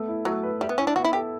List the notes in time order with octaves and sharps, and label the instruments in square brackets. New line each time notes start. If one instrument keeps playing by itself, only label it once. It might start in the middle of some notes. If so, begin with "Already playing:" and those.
Already playing: [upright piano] A3 B3
E4
[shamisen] F#3 [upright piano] A3
[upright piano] B4
[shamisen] G3 [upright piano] E5
[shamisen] B3
[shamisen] C#4 [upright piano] E4
[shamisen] D4
[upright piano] B3 [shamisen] F#4
[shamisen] E4
[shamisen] G4 [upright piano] A4